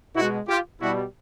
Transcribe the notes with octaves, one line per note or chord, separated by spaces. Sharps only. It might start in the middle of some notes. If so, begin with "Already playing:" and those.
B2 G#3 E4 F#4
F4 G4
B2 G3 E4 F#4